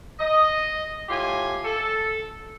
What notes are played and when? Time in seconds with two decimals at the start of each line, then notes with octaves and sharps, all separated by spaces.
0.19 D#5
1.08 A2 F4 G4 G#5
1.64 A4